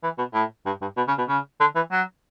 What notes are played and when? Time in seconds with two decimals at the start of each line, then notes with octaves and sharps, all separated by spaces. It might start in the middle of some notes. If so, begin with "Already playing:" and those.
0.03 E3
0.18 B2
0.34 A2
0.66 G2
0.81 G2
0.97 B2
1.08 C#3
1.18 B2
1.29 C#3
1.60 D3
1.75 E3
1.92 F#3